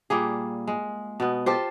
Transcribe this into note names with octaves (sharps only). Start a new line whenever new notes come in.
A#2 G3 A#3 G#4
G#3
B2 B3
F4 G4 A4 C5